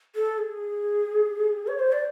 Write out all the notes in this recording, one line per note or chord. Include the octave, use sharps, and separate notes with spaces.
A4
G#4
C#5
C5
D5